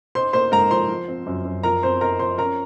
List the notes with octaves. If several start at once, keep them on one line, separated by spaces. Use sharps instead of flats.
D#4 C5 C6
A#3 C5 C6
G#2 A#4 A#5
F3 C5 C6
F3
C4
F#2
F#2
F3 A#4 A#5
C4 C5 C6
D#4 A#4 A#5
F3 C5 C6
C#4 A#4 A#5